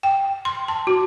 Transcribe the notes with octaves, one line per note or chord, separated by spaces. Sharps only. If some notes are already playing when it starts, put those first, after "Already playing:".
G5
C6
A5
F#4